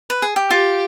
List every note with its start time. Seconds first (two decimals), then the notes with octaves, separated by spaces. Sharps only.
0.10 B4
0.22 G#4
0.36 G4
0.50 F4 G4